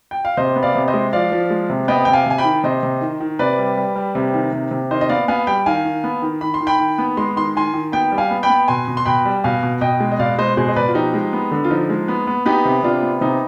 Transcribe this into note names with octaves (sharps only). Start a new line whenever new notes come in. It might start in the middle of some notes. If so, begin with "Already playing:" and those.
G5
F5
C3 C5 D#5
B3
D5 F5
C3
C5 D#5
G#3
F3 D5 F5
F3
G#3
C3
B3 D#5 G5
C3 G5
F5 G#5
C3 G#5
G5 B5
D#3
C3 C5 D#5
C3
D#3
D#3
C3 B4 D5
G3
G3
G3
C3
D#3
C3
C3
D#3 C5 D#5
D#5
B3 D5 F5
B3 F5 G#5
G3 G5 B5
D#3 F5 G#5
D#3
B3
D#3
D#3 B5
C6
D#3
G5 B5
D#3
B3
G#3 C6
D#3 C6
D#3 G#5 C6
D#3
B3 G5 B5
G3
F5 G#5
B3
G5 B5
B3
B2 G#5 C6
B2
C6
B2 G5 B5
G3
B2 F5 G#5
B2
B2 D#5 G5
G#3
D#5
B2 D5 F5
G#3 C5 D#5
B2 G#4 C5
D#5
B2 B4 D5
F4
F3 D#4 G4
G#3
B3
D3
F4
F3 D#4
G#3
B3
B3
B3 D#4 G4
C3
C3 D4 F4
B3
C3 D#4